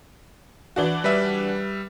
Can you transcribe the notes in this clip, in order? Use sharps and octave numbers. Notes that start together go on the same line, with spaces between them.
E3 D4 F#4
G3 B4 E5